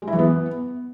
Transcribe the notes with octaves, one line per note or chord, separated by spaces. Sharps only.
G#3
E4
E3
B3